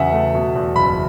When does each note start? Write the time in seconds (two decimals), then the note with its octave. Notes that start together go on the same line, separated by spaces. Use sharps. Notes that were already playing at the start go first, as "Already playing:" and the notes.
Already playing: E2 C#3 F#3 E5 F#5 G#5
0.13 A3
0.35 B2
0.55 E2
0.76 F#1 B5